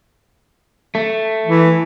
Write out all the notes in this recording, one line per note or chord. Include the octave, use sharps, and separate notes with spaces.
A3
E3